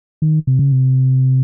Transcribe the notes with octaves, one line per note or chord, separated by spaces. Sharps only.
D#3
C3
C#3
C3